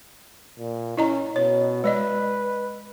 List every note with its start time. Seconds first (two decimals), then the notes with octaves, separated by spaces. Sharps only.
0.59 A#2
0.97 C#4 E4 D#5 A#5
1.36 B2 C#5
1.84 G#3 B4 D5 D#5